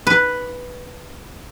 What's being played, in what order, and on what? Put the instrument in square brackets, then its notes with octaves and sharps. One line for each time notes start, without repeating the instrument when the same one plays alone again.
[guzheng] B4